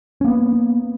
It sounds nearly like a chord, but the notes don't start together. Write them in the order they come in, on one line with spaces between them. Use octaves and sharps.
C#4 A#3 B3